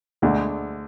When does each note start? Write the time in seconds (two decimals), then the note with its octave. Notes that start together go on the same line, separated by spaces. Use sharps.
0.22 D2 D3 G#3